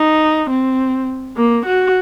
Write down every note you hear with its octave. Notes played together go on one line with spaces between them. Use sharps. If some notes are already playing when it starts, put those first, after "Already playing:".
Already playing: D#4
C4
A#3
F#4